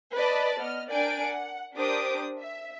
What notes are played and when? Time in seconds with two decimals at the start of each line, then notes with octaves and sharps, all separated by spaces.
0.16 B4 D5 D#5 A5 B5
0.60 B3 D#5 F6
0.92 D4 A#4 D5 G5 G#5 D7
1.23 F#5
1.76 D4 G4 A#4 C5 D6 D#6
2.40 E5